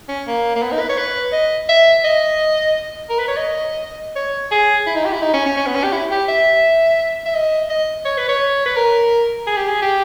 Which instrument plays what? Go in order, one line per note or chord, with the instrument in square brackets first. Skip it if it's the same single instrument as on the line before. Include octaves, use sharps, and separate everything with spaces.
[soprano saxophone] C#4
A#3
A#3
B3
D#4
B4
C#5
B4
D#5
E5
D#5
A#4
B4
C#5
D#5
C#5
G#4
E4
D#4
G4
E4
D#4
C#4
C#4
C#4
B3
C#4
G4
E4
G4
E5
E5
D#5
D#5
C#5
B4
C#5
B4
A#4
G#4
G4
G#4
G4